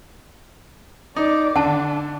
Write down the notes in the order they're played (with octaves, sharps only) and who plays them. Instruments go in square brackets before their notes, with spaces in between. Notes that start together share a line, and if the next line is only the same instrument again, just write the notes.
[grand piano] D#4 [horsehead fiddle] D5
[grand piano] D3 [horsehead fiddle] D4 [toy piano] F#5 A5